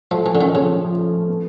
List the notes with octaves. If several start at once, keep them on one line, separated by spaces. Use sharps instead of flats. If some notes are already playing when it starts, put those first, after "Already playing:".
F3 A3
E3 F3
D3
D#3 C#4
C#3 F3
C#4
F3
A3
A3
B3